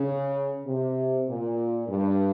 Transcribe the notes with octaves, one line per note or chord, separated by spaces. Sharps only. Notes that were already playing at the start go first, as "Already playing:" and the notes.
Already playing: C#3
C3
A#2
G2